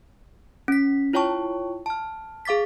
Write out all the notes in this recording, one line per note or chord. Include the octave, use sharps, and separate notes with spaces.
C#4 B6
E4 F4 C#5 G5 A5 C#6
A5 F6
G#4 F5 D6 A6 B6